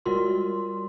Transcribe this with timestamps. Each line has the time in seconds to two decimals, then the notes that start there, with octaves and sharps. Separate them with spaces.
0.06 G3 G#3 F4 F#4 A#4 C6